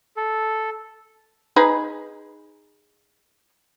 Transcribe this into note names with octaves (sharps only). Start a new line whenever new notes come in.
A4
D#4 G#4 B4